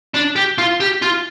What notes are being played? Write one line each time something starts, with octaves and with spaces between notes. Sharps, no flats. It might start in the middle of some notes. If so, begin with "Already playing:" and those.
D4
G4
F4
G4
F4